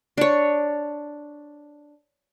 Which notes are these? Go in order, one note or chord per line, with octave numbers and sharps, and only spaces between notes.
D4 C#5